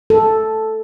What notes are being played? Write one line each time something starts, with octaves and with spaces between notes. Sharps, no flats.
A4